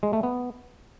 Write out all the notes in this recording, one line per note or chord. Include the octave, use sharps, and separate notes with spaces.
G#3
A3
B3